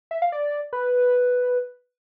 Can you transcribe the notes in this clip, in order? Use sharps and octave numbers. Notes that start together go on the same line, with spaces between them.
E5
F5
D5
B4